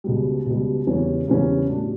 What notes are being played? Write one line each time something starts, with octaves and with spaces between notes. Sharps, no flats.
C#2 B2 G3
C#2 B2 G3
E2 C#3 G3 C#4
E2 C#3 G3 C#4
A2 G3 D4 F#4